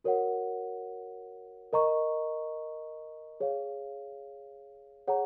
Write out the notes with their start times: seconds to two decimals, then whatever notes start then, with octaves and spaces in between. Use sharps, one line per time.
0.04 F#4 A#4 C#5 F#5
1.73 A#4 D#5 A#5 C#6
3.40 G#4 C#5 F5
5.08 G#4 C#5 F#5 A#5